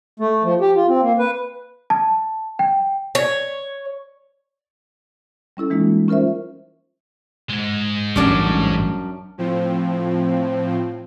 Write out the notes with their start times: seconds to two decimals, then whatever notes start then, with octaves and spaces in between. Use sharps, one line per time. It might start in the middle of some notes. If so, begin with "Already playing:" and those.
0.20 A3
0.44 F3
0.61 G4
0.76 F4
0.89 C4
1.02 A#3
1.19 B4
1.90 A5
2.59 G5
3.15 C#5
5.57 G3 C#4 E4 A4
5.70 E3 G#3 A#3 D#4 F4
6.08 C#4 F4 A#4 C5 E5
7.50 G#2 G#3
8.16 A1 F#2 G3 D4 A5
9.38 A2 F3 C4